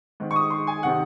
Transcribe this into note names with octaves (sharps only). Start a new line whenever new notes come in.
G#2 D#3
C#6
D#6
C6
G#5
C3 D#3 F#5